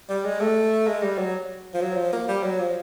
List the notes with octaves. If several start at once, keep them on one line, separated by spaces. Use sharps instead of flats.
G3
G#3
A3
G#3
G3
F#3
F3
F#3
F3
A#3
G3
F#3
F3